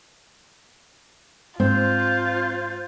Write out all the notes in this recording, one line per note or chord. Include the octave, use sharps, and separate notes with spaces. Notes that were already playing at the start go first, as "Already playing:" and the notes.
G#2 C4 F4 C5 C6 G6